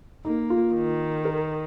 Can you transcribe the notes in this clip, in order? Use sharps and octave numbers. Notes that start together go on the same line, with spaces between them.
A#3 D#4
F4
D#3
A#4